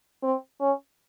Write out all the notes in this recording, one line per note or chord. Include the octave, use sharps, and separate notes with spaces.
C4
C#4